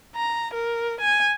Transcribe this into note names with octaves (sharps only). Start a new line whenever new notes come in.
A#5
A#4
G#5